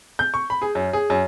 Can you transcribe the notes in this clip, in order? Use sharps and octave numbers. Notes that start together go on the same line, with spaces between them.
G6
C#6
B5
G#4
F#2
G#4
F#2